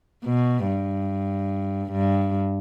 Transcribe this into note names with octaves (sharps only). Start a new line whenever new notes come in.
B2
G2
G2